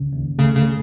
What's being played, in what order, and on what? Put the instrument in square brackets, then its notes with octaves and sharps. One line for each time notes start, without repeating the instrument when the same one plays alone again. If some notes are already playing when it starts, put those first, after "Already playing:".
Already playing: [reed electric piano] C#2 C#3
D#2
[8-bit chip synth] C#3 [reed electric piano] A3
[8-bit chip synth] C#3